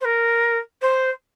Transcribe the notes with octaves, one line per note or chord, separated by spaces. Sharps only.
C5
A#4
C5